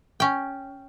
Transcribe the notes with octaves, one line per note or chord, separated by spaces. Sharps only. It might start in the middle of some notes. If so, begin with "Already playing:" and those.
C#4 G5